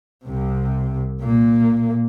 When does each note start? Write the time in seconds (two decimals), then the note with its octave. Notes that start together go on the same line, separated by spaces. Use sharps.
0.25 C2 C3
1.20 A#2 A#3